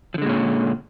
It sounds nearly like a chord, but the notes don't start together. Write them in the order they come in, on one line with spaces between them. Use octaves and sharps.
F3 D3 G#3 A#2 C#4